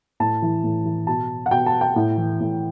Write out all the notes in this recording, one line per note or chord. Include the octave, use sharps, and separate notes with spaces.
A2 A5
E3
A2
E3
B2 A5
F#5
B2 G5
A5
G5
A2
E3
A2